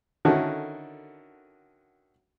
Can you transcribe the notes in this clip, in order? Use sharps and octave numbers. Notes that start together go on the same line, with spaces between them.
D3 D#3 C#4 E4 F#4 A4